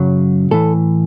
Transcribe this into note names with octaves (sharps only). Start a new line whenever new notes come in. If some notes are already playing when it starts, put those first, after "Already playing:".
Already playing: F#2 C#3 F#3
A2 E3 A4